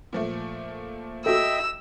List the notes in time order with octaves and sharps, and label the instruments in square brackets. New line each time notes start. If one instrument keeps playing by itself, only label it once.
[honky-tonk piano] A#2 F3 A3
[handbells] F#4 A4 [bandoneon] D#5 E5 G5 [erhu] E6